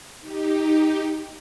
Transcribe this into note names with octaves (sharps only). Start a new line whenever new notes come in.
D#4 G4